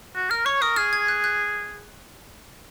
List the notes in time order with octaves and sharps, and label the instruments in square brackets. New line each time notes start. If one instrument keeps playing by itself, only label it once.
[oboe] F#4
[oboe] A#4 [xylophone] F6
[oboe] C#5 [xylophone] C#6
[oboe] A#4 [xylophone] D#6
[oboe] G#4 [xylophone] F6
[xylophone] G#6
F#6
F#6